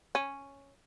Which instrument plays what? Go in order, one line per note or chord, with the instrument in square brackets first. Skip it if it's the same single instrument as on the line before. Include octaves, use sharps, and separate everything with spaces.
[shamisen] C#4